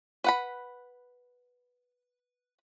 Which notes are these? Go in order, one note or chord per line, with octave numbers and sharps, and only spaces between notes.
B4 F#5 B5